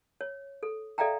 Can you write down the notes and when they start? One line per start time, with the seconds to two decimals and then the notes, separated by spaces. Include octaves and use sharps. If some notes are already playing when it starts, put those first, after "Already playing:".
0.21 C#5
0.63 A4
0.98 A4 D5 E5 F5 G5 A#5